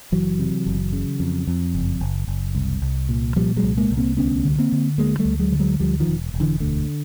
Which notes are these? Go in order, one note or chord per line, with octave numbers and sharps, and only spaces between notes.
F#1 E3 F#3
C3
F#1
C#3
F2
F2
F#1
F#1
F#1
C2
C2
A#2
A#2 F3 G3
F#3 G#3
C2
G#3 A#3
C2
A#3 C4
D2 B3 C#4
D3
A#3 C4
D3
D2 G#3 A#3
G3 A3
D2
F#3 G#3
D3
F#3 G#3
D2 F3 G3
D#3 F3
E1
E1
D3 E3
D2 D3